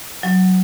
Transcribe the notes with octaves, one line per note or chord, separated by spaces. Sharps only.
F#3